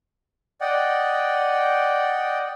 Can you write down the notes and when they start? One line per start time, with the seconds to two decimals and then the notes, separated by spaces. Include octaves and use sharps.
0.61 D5 D#5 F#5 G5